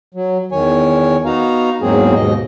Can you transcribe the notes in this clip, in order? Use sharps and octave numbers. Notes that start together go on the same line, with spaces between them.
F#3
E2 D#3 C#5 G#5
B3 D#4 F#4 F5 A#5
E2 G#2 F#3 A#3 C4 G#4
D#2 G#2 B2 D#5